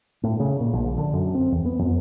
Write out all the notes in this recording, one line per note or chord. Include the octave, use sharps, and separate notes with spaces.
A2
C#3
A#2
A#1
D3
F#2
C4
E2
B3
F2